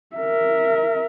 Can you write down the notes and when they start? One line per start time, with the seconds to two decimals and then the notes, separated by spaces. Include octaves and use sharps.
0.16 A#4 E5